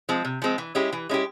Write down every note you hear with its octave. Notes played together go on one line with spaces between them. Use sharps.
F3 G#3 C4
C3
F3 G#3 C4
E3
G#3 C#4 E4 G4
E3
G#3 C#4 E4 G4